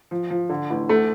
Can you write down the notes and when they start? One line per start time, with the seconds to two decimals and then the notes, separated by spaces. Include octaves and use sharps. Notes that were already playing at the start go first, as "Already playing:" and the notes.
0.11 F3
0.30 F3
0.49 D3
0.70 A1
0.89 D2 A3